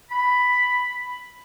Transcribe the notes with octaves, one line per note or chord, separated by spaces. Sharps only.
B5